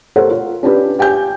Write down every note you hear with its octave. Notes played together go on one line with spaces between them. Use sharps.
G4 A4 A#4 C5 C#5 F#5
F4
C#4 D4 F4 G4 B4
G4 G5 G#5 G6